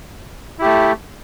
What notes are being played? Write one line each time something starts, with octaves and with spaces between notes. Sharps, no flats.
A3 E4 G4